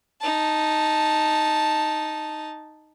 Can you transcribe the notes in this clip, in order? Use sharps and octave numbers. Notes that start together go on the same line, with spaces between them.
D#4 A5